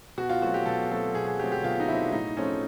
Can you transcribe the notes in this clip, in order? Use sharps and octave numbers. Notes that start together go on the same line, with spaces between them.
B2 F#4
F4
F#3 A3 C4 F#4
G4
B2 A4
F#3 A3 C4 A4
B2 G#4
G#4
F#3 A3 C4 G4
G4
B2 F4
D#4
F#3 A3 C4 E4
A2 D#4
F3 A3 C4 C#4